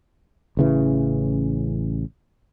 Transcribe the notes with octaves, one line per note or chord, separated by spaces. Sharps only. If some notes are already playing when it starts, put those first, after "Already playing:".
A1 C#3 E3